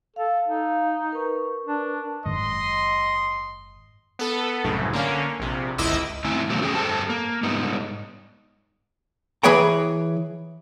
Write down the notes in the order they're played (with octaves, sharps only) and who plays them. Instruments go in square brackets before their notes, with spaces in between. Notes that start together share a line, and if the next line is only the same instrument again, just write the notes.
[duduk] A4 [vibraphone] F5
[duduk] D#4
[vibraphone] A#4 B4 C#6
[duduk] D4
[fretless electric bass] F#1 G#2 D#3 [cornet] D#5 [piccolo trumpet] C6
[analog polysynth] B3 A4
C2 F#2 A2 C#3
D3 A#3 C#4
A#1 C3
G1 C#2 E4 D#5 D6 E6
[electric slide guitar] G2 D#3 A3 C4 E4 G#5
B2 D3 E3 F#3 A3 A#3
C#4 G4 G#4 G5 G#5
G2 G3 G4 A4 C5 A5
A#3
G#2 G3 B3 D#4
[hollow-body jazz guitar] E3 G#4 B4 C#5 G5 A#5